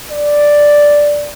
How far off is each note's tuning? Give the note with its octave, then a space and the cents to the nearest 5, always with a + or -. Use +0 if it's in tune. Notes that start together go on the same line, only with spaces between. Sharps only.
D5 +0